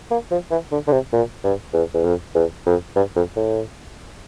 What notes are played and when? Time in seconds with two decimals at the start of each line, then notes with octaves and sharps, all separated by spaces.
0.11 A#3
0.31 F3
0.51 E3
0.71 D3
0.87 D3
0.92 C3
1.13 A#2
1.44 G2
1.73 E2
1.94 E2
2.04 F2
2.35 E2
2.66 F2
2.96 G2
3.16 F2
3.36 A2